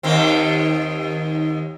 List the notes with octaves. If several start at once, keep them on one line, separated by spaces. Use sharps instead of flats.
D#2 D#3 C4